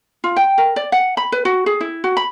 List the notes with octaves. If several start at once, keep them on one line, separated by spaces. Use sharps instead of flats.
F4
G5
A#4
D5
F#5
B5
B4
F#4
G#4
E4
F#4
B5